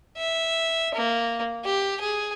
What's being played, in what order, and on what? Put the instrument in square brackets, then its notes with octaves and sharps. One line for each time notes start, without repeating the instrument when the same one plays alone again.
[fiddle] E5
A#3
G4
G#4